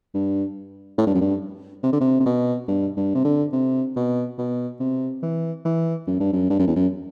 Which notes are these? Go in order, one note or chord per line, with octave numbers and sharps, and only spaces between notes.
G2
A2
G2
F#2
G2
C3
D3
C3
C3
B2
G2
G2
C3
D3
C3
B2
B2
C3
E3
E3
F#2
G2
F#2
G2
F#2
E2
F#2